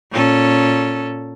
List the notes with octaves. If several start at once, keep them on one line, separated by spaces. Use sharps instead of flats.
A#2 C#4 A4